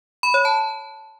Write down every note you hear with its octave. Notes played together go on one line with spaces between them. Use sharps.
B5
C#5
A5